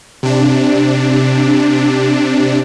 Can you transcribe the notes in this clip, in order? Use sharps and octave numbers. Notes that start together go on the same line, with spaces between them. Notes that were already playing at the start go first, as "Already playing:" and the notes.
C3 D4